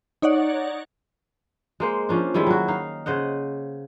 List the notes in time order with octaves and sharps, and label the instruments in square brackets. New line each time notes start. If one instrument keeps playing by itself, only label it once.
[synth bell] D#4 C#5 D5 F#5
[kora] G#3 A#3 C5
F3 C#4 D4
D#3 G3 G#3 E4
F#3 F#4
D#4 F5
C#3 C5 D#5 F#5